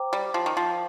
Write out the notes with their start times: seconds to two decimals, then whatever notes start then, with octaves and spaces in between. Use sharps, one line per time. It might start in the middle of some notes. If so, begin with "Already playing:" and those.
Already playing: C5 G5 A#5 D6
0.13 G3
0.34 F3
0.46 D#3
0.57 F3